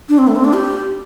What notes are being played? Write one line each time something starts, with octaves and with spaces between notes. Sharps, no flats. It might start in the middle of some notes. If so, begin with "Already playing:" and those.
D4
C4
A3
C4
D4
G4